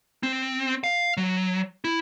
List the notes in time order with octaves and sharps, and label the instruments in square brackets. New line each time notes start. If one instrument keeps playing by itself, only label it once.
[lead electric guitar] C4
F5
F#3
E4